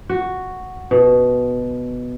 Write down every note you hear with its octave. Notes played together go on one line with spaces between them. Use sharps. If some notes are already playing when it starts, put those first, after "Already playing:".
F#4
B2